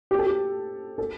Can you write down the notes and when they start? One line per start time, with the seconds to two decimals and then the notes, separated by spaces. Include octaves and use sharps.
0.11 G4
0.19 A4
0.27 G4
0.98 A4